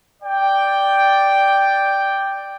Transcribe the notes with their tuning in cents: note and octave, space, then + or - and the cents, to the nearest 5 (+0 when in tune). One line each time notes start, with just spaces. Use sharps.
D5 +0 G5 +0